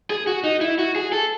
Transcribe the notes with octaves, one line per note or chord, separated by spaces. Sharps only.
G#4
F#4
D#4
E4
F#4
G#4
A4